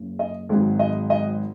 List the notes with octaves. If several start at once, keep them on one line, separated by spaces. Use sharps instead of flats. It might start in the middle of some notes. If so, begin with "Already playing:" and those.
Already playing: F#1 F#2 C#3
D#5
G#1 G#2 F#3
D#5
D#5